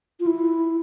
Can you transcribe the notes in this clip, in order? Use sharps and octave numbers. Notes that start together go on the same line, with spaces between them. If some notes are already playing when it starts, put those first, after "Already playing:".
F4
E4